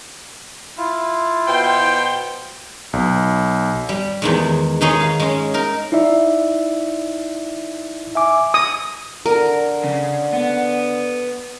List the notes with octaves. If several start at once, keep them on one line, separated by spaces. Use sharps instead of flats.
E4 F4
B2 C5 G5
B1
G3
E2 D#3 G#3
D#3 D#4 G#4 C#5 C6
F5
G#3 C#4
D#4 A#4
D#4 E4 D5 E5
E5 G#5 D6
D#6
D3 A#4
C#3
B3